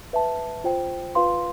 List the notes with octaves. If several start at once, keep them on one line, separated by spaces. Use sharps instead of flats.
B4 E5 A5
F4 C5 G5
F4 B4 F5 C6